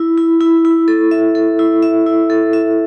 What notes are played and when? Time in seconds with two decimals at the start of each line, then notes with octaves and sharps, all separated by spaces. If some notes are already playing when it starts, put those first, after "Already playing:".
Already playing: E4
0.18 E4
0.41 E4
0.65 E4
0.88 A4
1.11 E5
1.35 A4
1.59 E4
1.83 E5
2.06 E4
2.30 A4
2.53 E5